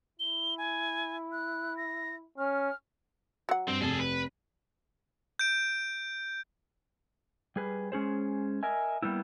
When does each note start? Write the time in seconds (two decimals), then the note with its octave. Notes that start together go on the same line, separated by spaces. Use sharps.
0.20 E4 G7
0.58 G#5
1.32 F#6
1.77 A#6
2.38 C#4 F6
3.49 F#3 F#5
3.68 G2 C4
3.81 F1 G#4 A4
4.00 B4
5.39 G6 D7
7.56 G3 G#4 B4
7.92 G#3 C#4 G#4 C5
8.63 A#4 D#5 E5 G#5
9.02 G3 A#3 B3 E4